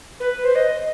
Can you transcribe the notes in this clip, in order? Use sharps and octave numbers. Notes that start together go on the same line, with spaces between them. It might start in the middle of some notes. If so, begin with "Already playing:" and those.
B4
C5
D#5